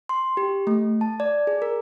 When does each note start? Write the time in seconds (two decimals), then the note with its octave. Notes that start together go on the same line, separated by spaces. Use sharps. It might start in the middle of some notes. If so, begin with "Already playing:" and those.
0.09 C6
0.37 G4
0.67 A3
1.01 A5
1.20 D5
1.47 G#4
1.62 A#4